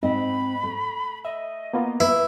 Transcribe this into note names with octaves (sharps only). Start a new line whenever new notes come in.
G#2 C4 D#5 B5
A3
D#5 E5
A#3 B3 F4
E4 B4